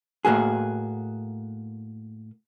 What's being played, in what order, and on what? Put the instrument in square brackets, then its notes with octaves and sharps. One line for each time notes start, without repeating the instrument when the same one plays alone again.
[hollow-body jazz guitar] A2 A#3 F#4 G#4